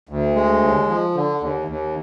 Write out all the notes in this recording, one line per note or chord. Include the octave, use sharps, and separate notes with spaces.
D2
G#3
D#2
F3
D3
D#2
D#2